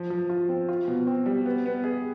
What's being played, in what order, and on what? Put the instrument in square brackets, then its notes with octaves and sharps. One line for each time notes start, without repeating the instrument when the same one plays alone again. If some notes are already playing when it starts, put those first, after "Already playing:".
Already playing: [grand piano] F3
F3
F4
C4
F4
B2
C4
G3
B3
B3
G#4